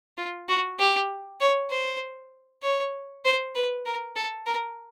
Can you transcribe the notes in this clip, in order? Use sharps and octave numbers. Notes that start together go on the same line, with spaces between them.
F4
F#4
G4
C#5
C5
C#5
C5
B4
A#4
A4
A#4